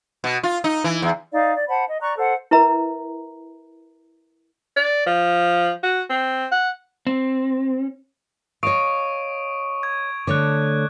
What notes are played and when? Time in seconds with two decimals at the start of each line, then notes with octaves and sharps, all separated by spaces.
0.24 B2
0.43 F4
0.64 D#4
0.84 E3
1.02 E2
1.33 D#4 D5 F5
1.55 D5
1.68 C5 F#5 A5 B5
1.86 D#5
2.01 D5 A#5 C#6 F#6
2.17 A4 C5 F#5
2.51 E4 A#4 B4 E5 A#5
4.77 D5
5.07 F3
5.83 F#4
6.10 C4
6.52 F#5
7.07 C4
8.63 C#5 D#5 F5 C#6 D#6 D7
9.83 C#6 G#6
10.27 D3 A3 C#5 D6 F#6